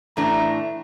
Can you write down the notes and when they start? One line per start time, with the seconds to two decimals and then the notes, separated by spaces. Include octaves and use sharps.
0.17 A2 E3 A3 D4 A#5